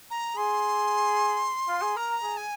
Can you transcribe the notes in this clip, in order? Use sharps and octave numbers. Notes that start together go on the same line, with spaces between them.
A#5
G#4 C6
F4
G#4
A#4 A#5
G#4
G#5